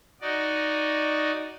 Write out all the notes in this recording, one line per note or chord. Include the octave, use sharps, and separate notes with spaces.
D#4 F#4 D5 D#5